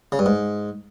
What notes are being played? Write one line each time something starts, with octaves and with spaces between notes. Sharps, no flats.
C#3
G2
G#2